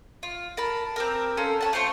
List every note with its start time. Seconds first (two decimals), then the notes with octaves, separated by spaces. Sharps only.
0.23 F4
0.57 A#4 A5 B5
0.96 C4 G4 A#4
1.37 C#4 A4 F5 C6
1.61 C#5 F#5 A5
1.73 A3 F4 C5 C#6